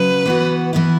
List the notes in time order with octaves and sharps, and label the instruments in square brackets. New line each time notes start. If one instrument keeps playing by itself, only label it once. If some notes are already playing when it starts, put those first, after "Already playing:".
Already playing: [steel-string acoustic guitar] C#3 F#3 [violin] B4
[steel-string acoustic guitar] E3 B3 F#4
E3 B3 E4